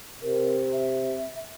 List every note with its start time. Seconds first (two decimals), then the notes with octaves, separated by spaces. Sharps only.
0.22 C3 A#4
0.73 E5